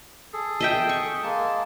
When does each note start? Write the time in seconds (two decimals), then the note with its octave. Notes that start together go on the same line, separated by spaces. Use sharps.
0.33 G#4 A4
0.60 D#5 E5 G5
0.89 C#6
1.23 G#3 A#3 A5